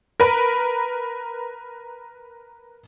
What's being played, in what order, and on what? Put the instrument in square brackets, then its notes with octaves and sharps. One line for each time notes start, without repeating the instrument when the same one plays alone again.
[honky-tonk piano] A#4 B4